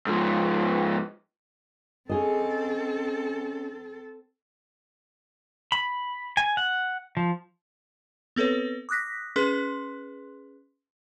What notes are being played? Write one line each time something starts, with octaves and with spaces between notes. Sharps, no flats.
G#2 F3
C4 C#4 G#4 A4 D#5
B5
G#5
F#5
F3
B3 C4 A4 B4 C#5
D6 D#6 F#6 A#6 B6
C#4 G#4 B4 C6 F#6